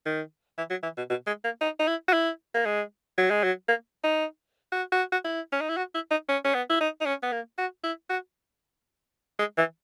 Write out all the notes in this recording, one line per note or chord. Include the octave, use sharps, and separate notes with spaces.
D#3
E3
F#3
E3
B2
B2
G#3
A#3
D#4
D#4
E4
F#4
E4
A#3
G#3
F#3
G#3
F#3
A#3
D#4
F#4
F#4
F#4
E4
C#4
D#4
E4
F#4
E4
D#4
C#4
C#4
B3
E4
D#4
D#4
C#4
B3
A#3
F#4
E4
F#4
G#3
E3